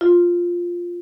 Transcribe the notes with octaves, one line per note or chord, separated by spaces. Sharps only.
F4